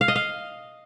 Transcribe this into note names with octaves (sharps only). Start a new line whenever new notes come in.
F5
D#5
F5